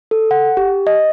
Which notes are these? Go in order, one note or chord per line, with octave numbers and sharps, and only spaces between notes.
A4
F#5
G4
D#5